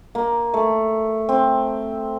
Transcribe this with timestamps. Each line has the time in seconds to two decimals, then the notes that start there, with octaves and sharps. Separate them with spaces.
0.15 A#3
0.54 A3
1.29 C4